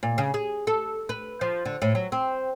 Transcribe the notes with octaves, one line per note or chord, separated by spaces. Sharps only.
A#2
C#3
G#4
A4
B4
F3
D3
A2
F#3
C4